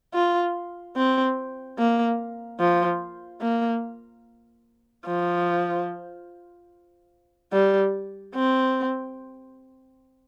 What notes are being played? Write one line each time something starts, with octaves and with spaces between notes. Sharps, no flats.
F4
C4
A#3
F3
A#3
F3
G3
C4